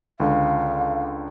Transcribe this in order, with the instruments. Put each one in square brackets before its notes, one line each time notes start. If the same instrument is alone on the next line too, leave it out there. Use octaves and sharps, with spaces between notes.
[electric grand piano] C#2 D3 [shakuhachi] F5